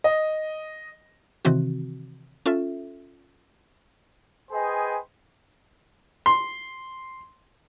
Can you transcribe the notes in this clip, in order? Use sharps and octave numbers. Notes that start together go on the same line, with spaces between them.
D#5
C3 D#3 E3 C4 F#4
C#4 F4 A4 E5
G#4 B4 C5 D#5 G5 G#5
C6